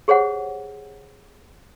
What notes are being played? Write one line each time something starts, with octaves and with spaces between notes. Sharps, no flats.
G4 G#4 C5 C#5 F#5